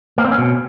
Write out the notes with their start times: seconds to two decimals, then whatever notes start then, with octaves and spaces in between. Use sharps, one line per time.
0.18 A#3
0.25 C4
0.31 C#4
0.38 B2